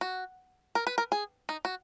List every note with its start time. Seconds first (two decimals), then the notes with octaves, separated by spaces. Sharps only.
0.01 F#4
0.75 A#4
0.87 B4
0.98 A#4
1.12 G#4
1.49 D#4
1.65 F#4